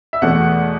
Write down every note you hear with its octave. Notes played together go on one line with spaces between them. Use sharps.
E5
E2 B2 A3 F#5